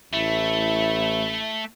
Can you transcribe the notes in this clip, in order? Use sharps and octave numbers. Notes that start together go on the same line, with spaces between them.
A1 A3 E4